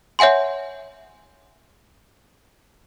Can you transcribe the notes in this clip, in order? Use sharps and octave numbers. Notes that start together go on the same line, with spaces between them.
C#5 E5 F#5 G#5 C6